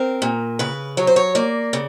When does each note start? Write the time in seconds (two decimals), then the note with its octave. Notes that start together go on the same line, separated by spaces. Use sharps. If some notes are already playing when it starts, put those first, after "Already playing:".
Already playing: C4 A#4
0.22 A#2
0.59 C#3 B4
0.97 F#3 C#5
1.07 C5
1.16 C#5
1.35 A#3 D5
1.73 C#3